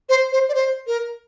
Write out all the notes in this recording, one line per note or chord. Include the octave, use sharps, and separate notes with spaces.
C5
C5
D5
C5
A#4